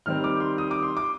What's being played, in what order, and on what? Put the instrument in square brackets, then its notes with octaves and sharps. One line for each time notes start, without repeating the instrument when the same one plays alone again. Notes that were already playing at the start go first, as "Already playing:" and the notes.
[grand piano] D#3 G3 C4 D#4 F6
D6
C6
D#6
D6
C6
D6